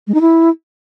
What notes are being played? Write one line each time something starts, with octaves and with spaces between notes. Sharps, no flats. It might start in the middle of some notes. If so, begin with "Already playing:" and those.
G#3
D#4
E4